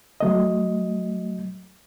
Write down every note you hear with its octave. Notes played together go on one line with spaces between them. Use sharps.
F#3 A3 D#5